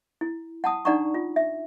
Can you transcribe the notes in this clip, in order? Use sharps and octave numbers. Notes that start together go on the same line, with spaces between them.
E4
F#5 A5 D#6
D4 D#4 D5 F#5 A#5 C#6
F4
E5